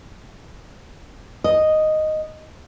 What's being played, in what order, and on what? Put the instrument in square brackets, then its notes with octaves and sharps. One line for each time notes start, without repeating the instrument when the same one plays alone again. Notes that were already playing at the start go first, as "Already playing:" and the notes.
[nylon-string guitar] D#5